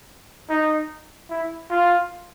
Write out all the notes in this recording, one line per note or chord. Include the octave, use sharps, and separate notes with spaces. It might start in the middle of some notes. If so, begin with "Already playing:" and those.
D#4
E4
F4